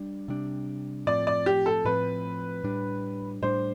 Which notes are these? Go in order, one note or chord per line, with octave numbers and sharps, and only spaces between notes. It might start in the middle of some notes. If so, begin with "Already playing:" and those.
Already playing: G3 D4
C3 G3 D4
A2 F3 C4 D5
D5
G4
A4
A2 F3 C4 B4
A2 G3 D4
A2 G3 D4 C5